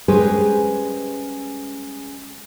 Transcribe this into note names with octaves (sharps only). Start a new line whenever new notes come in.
G3 G#3 C#4 G#4 B4 C5